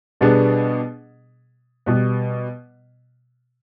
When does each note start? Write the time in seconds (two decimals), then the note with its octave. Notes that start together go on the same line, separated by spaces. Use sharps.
0.21 B2 G3 B3 D4 G#4
1.86 B2 G3 B3